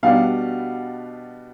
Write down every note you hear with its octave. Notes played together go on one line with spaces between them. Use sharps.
B2 G3 B3 D4 F5